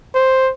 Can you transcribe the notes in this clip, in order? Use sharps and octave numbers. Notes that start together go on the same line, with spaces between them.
C5